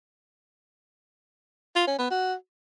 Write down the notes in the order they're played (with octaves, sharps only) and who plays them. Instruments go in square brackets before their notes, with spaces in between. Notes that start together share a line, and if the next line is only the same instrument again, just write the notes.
[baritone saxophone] F4
C#4
B3
F#4